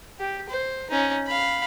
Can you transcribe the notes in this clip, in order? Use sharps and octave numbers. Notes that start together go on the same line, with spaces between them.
G4
C5
C#4 D#4
F5 B5